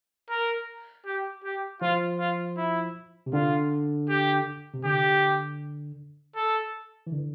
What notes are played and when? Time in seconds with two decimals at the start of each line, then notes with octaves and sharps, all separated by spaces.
0.30 A#4
1.06 G4
1.44 G4
1.81 F3 F4
2.19 F4
2.57 E4
3.26 C3
3.33 D3 F4
4.09 G4
4.74 C3
4.85 D3 G4
6.36 A4
7.07 E3
7.12 D3